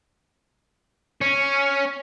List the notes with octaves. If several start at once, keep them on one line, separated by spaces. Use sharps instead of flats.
C#4